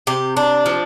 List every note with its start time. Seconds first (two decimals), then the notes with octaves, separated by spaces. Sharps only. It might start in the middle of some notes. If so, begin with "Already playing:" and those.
0.07 C3 G4
0.37 D4
0.66 F3